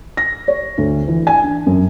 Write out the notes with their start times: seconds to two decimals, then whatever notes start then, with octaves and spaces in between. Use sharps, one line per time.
0.17 A#6
0.48 C#5
0.78 D2
1.08 E3
1.27 G#5
1.44 D4
1.66 F#2